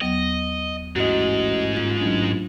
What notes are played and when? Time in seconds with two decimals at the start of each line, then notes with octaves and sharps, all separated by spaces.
0.01 D#2 F#3 B3 D#5
0.96 A1 G#2 G#3 F#4 D#5
1.77 D#1 F4
2.00 A1 F#3 D4